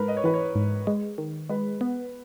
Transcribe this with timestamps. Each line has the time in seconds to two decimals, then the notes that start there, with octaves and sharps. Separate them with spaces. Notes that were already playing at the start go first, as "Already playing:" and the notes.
Already playing: G#2 A#4 B4
0.08 D#5
0.17 C#5
0.24 E3 B4
0.34 C#5
0.55 G#2
0.87 G#3
1.18 D#3
1.50 G#3 B4
1.81 B3